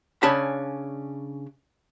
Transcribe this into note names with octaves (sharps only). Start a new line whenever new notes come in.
C#3 C#4 D4 A5 B5